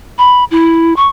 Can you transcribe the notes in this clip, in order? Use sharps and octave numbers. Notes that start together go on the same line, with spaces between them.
B5
E4
C#6